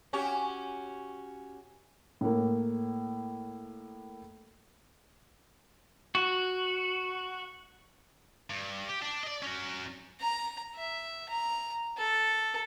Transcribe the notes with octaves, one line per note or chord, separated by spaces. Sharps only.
C#4 F#4 G4
A2 A#3
F#4
G2
G4
D4
D5 D#5
C#4 F#4
A#5
E5
A#5
A4